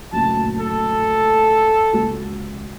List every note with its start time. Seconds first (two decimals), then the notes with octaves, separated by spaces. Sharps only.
0.13 F#1 D2 A#2 A5
0.61 A4
1.93 C#2 F#4